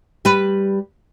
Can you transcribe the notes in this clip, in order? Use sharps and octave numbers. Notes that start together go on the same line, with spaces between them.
G3 B4